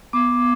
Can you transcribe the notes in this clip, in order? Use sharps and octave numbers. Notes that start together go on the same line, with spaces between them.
B3 D6